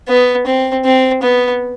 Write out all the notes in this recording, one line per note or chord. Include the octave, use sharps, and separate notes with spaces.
B3
C4
C4
B3